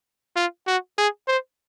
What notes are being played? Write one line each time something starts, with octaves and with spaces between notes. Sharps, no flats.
F4
F#4
G#4
C5